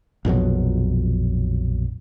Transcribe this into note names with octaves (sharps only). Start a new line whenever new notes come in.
A#1 F2 B2 F#3